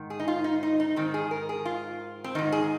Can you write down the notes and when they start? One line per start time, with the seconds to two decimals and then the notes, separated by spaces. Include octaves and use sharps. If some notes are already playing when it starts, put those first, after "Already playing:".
Already playing: G#2 D#3
0.10 G#4
0.20 D#4
0.28 F4
0.44 D#4
0.63 D#4
0.80 D#4
0.96 G#2 D#3 C4
1.14 G#4
1.31 A#4
1.49 G#4
1.65 F4
2.24 C4
2.35 G#2 D#3 D#4
2.52 G#4